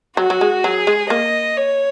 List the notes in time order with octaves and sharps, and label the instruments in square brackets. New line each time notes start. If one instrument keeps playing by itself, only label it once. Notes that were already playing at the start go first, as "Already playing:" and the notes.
[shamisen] F#3 [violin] F#4
[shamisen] F#3
G#3
[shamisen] F#3 [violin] G#4
[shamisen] G#3
[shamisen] A#3 [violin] D#5
[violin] C#5